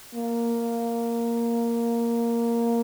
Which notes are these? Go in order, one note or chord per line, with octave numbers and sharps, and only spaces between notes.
A#3